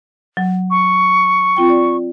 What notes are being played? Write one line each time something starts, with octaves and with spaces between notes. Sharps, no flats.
F#3
C#6
C4 F4 G5
D5